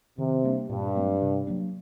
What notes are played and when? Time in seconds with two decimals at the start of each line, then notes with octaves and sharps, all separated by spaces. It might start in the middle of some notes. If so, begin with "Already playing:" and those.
0.18 C3 D#3
0.44 G3 A#3 D4
0.69 G2 A#2
0.95 F#3 A3 C4
1.22 C3
1.47 F#3 A#3 D4